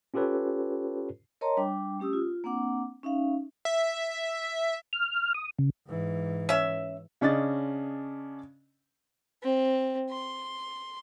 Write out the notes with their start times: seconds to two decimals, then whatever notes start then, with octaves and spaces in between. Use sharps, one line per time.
0.14 C#4 F4 G4 A4 B4 C#5
1.41 A#4 C#5 D#5 A5 A#5 C6
1.57 G3 D4 G5 D6
1.99 A3 C#4 G4 D#6 E6
2.13 F4
2.44 A#3 C4 D4 F#5 D6
3.03 C#4 D#4 E5 F5
3.65 E5
4.93 F6
5.34 D#6
5.59 C#3
5.87 G#2 E3
6.49 C#4 E5
7.21 C#3 C#4 D4 D#5 A6
9.43 C4
10.10 C6